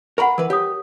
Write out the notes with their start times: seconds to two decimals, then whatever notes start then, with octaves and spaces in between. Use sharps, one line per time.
0.18 A#4 F#5 A#5 B5 C#6
0.38 E3 A#4 B4
0.50 G4 C#5 D#6